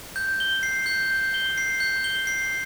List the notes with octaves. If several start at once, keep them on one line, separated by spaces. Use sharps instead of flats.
G6
G7
C7
G6
G6
G7
C7
G6
G7
C7